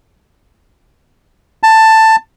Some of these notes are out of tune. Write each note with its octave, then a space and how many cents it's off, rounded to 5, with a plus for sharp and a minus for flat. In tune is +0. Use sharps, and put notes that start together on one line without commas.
A5 +10